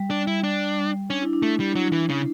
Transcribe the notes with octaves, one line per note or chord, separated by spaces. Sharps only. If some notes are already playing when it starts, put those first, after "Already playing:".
Already playing: G3
D4
E4
D4
C#4 D4
E4
D4
A3
G3
F#3
E3
C#3